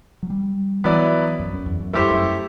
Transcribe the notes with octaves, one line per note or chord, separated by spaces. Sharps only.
F#3
G3
E3 F#3 B3 E4 B4 D5
F#2
F#2
E2
F#2
G2 A3 E4 G4 C5
F#2